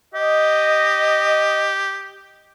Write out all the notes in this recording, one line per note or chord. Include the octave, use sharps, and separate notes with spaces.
G4 D#5